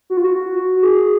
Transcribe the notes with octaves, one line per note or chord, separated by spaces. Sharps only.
F#4
F4
F#4
G#4